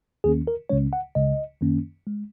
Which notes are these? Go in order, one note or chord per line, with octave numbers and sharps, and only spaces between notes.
D#2 D#3 A#3 C#4 G#4
A#4
C#2 C#3 G#3 C#4 C#5
F#5
C#2 C#3 G#3 D#5
F#2 D#3 A#3 C#4
G#3